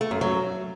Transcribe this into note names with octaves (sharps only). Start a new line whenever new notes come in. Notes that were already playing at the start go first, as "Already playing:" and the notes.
A3
F#2
F#3